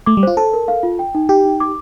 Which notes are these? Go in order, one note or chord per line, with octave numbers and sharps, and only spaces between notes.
A3 D6
G3
F4 C5
A4 A5
A#4
F5
F4
G5
D#4
G4 G5
D#4
D6